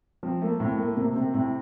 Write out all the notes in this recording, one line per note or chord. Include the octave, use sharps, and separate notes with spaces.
F3 C4
A3 A#3
A2 C4
A3 A#3
C3 A#3
C3 C4
A2 C4